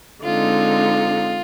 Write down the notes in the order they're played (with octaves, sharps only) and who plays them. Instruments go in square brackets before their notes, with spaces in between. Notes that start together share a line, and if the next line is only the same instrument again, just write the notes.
[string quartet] D3 G#3 C4 D#4 [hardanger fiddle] F4